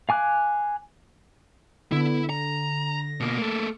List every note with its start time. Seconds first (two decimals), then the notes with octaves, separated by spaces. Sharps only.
0.09 F5 G#5 D6 F#6
1.92 D3 B3 E4
2.30 A#5 A#6
3.20 B2 A#3
3.38 A3 A#3 A4